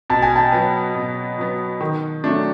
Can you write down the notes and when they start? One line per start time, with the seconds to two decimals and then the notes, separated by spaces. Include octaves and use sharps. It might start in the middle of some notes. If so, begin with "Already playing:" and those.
0.10 B2 A5
0.22 G#5
0.36 G5 A5
0.52 F#3 B3
0.95 B2
1.38 F#3 B3
1.81 D#3
2.24 F#3 A3 D4